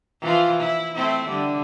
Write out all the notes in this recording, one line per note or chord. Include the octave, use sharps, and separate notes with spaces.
E3 F3 F4
E4
A3 C4 E4
D3 G3